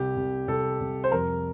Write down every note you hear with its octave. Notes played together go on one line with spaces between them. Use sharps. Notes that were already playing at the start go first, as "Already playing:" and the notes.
Already playing: C2 G4
C2
C2 A4
C2
C5
F2 A#4